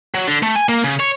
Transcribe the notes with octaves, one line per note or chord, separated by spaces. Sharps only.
F#3
D3
A3
G#5
A#3
C#3
C#5